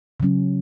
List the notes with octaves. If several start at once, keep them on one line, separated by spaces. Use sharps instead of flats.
C#3 F#3 C#4